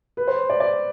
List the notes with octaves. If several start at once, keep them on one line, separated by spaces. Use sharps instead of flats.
B4
C5
D5
D5